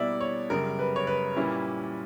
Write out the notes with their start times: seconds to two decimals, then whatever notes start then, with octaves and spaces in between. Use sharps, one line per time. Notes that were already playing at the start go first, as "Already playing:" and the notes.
Already playing: B2 G3 A#3 E4 D5 E5
0.21 C#5
0.50 F#2 C#3 G3 A#4
0.79 B4
0.96 C#5
1.07 B4
1.36 A#2 G3 A#3 C#4 E4